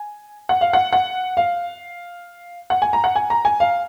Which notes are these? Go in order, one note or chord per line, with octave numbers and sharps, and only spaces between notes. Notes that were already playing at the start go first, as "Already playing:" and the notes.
Already playing: G#5
F#5
F5
F#5
F#5
F5
F#5
G#5
A#5
F#5
G#5
A#5
G#5
F5